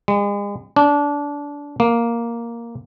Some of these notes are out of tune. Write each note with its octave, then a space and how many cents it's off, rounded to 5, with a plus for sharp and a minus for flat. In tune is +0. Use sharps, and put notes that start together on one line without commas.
G#3 -40
D4 -20
A#3 +0